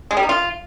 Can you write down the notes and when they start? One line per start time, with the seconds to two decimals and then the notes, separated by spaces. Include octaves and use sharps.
0.11 G#3
0.17 G3
0.23 D#4
0.29 F4